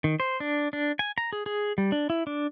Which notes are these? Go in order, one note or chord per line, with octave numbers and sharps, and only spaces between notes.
D#3
C5
D4
D4
G#5
A#5
G#4
G#4
G3
D4
E4
D4